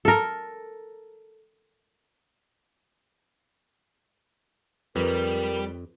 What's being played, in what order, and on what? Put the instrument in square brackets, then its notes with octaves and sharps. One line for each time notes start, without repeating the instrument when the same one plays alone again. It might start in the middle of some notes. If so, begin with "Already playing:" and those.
[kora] A4 A#4
[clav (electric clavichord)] F2 [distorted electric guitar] G3 [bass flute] A#4 [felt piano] B4